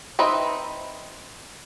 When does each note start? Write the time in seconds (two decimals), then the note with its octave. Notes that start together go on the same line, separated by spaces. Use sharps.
0.19 C4 D#4 B4 D#5 E5